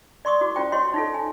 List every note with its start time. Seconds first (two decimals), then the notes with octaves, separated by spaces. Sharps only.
0.25 D5 C6 C#6 D#6
0.41 E4 F#4 D6
0.55 C#4 F4 C5 G5 C#6
0.72 F#4 C#5 D#5 C6 C#6
0.94 D#4 F4 A4
1.14 G#5